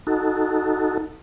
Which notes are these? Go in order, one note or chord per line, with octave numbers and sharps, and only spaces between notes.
D#4 F#4 A4